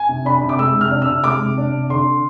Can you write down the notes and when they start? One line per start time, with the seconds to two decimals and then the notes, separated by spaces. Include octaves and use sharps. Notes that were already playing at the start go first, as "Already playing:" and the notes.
Already playing: G#5
0.09 C3
0.25 D4 B5
0.41 C3
0.49 D6
0.59 G#3 E6
0.75 C3
0.81 F6
0.91 D4
1.02 E6
1.07 C3
1.24 G#3 D6
1.41 C3
1.57 D4
1.73 C3
1.90 D3 C6